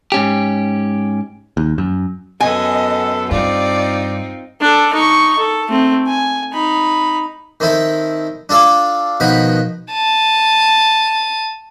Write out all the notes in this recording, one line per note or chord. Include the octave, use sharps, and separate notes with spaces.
G#2 C#4 G4
D#2
F#2
F#2 B3 A4 D#5 G#5
G2 C4 D#4 F4 D5
D4 A4
D#4 C#6
A4
A3 C4
G#5
D#4 B5
D#3 C4 E4 A4
D4 F4 A4 D5 F5
B2 D#3 F3 F#5 B5
A5 D#7